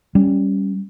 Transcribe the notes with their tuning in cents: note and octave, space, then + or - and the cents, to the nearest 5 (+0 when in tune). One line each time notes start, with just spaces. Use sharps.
G3 +0 C#4 +0